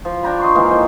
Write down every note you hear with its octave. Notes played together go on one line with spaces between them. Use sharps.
F3
D4 G5 A#5 B5
D#5 C6 C#6
D#3 E3 G#3 A#3
F3 D#5 G5